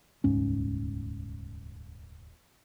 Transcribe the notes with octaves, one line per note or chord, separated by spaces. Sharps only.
D#1 C#2 G#2 C#4